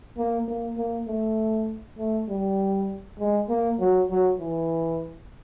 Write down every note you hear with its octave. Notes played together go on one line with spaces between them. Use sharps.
A#3
A#3
A#3
A3
A3
G3
G#3
A#3
F#3
F#3
E3